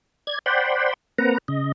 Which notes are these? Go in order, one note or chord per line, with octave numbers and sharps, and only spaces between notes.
D5 G#6
C5 D5 F#5 G5 B5 C6
A#3 C4 B4 F#5 A#5
C#3 D#5